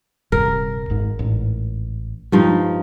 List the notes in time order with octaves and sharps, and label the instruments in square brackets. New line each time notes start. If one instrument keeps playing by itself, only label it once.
[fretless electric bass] D#1 C2 G2 [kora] A#4
[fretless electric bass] G#1 G#2
A1 G#2
[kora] G2 F3 D#4 [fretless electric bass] G3 G#3